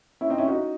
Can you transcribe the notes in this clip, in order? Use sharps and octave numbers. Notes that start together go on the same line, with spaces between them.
C#4 E4
C4 D#4
C#4 E4
D#4 F#4